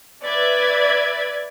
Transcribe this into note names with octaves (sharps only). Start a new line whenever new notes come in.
B4 D5 E5 G#6